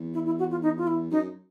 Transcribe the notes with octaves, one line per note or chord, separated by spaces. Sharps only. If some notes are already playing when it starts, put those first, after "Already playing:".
Already playing: E2
E4
E4
F#4
F4
D#4
F4
E4
F#2 D#4